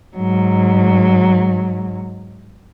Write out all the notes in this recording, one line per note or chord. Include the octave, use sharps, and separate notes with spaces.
G#2 F#3